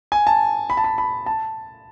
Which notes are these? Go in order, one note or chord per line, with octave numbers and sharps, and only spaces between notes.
G#5
A5
B5
A5
B5
B5
A5